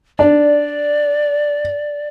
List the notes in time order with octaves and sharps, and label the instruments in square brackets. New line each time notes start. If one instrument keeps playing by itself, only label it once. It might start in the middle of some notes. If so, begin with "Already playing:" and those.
[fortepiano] D4 [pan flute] D5